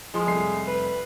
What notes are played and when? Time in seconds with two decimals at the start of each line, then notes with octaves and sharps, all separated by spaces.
0.14 F3 G#3 C6
0.26 F1 C2 C7
0.67 B4